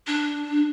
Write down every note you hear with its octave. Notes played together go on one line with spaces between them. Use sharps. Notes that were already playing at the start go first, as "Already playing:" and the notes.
D4